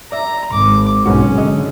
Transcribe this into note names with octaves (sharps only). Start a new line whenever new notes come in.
D5 E5 A#5
G#1 D6
B1 G#2 C#4 F#4
D3 G#3 D#5